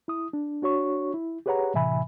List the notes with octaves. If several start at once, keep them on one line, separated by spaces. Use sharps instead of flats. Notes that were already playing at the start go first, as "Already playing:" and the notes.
E4 D#6
D4
D4 F#4 C#5 C#6
E4
G4 G#4 B4 C#5 F#5 A#5
A2 C3 E3 E5 G#5 B5